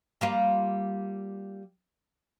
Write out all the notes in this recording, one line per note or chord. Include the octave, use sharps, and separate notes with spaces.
G3 A#3 F4